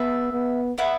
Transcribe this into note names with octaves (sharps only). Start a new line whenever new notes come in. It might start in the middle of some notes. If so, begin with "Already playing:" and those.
Already playing: B3 G#4 B4 E5 A5
B3
B3 E4 B4 F#5